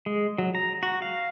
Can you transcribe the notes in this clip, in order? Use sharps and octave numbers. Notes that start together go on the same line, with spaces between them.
G#3
F#3
A#5
F#4
F5